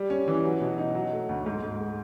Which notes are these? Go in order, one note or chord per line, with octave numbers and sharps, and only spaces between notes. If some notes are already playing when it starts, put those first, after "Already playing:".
Already playing: G3
C#4
E3
F#3
B2
D#4
F#3
A3
D2
G#2
G#2
G#3